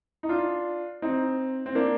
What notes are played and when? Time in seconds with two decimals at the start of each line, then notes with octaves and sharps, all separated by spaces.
0.23 D#4
0.29 D4 F4
1.02 C4 D#4
1.66 C4
1.75 A#3 D4